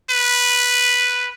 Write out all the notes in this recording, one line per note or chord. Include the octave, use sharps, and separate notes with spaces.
B4